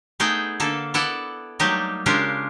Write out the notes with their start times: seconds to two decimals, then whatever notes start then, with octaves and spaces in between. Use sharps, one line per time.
0.20 A3 B3 D#4 G#4 G5
0.60 D3 A#3 A4
0.94 B3 E4 A4 D5 F#5
1.60 F#3 G3 A3 A#3 D#4 G4
2.06 C#3 G#3 D4 F4 G4 A#4